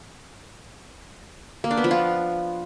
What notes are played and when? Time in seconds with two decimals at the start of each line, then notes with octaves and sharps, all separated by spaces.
1.64 A#3
1.71 D4
1.77 B3
1.84 F3
1.91 F4